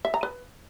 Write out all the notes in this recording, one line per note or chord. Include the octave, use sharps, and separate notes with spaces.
E5
A#5
B4